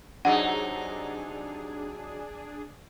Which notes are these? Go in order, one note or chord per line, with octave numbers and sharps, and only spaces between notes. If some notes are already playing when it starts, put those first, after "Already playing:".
C3 F#3 D4 D#4 G#4 F#5